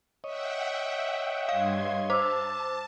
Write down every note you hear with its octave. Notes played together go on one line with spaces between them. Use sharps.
C#5 D#5 E5 F#5 G5
G2 F5 C6 G#6
C5 A5 D6 E6